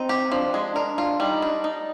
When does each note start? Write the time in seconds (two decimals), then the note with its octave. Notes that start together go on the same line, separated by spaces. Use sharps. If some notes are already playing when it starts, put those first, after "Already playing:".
Already playing: C4 D#4
0.09 G4
0.32 F3 D4
0.54 G#3
0.76 D4 A#4
0.98 F4
1.20 G3 D#4
1.42 D4
1.64 D#4